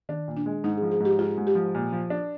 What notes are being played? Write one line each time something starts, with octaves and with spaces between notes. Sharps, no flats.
D#3 D4
A#2
D4
G#3
G#2 D#4
F3 G#4
G#4
G#2 G4
G#3 F4
G#2
G4
F3
A#2
F3
D4